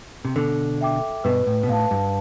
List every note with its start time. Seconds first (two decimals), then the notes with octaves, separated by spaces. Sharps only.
0.25 C3
0.36 B2 D3 A4
0.81 E5 G5 D6
1.24 G2 B2 B4
1.46 A2
1.63 B2
1.69 A2 F5 A5
1.91 G2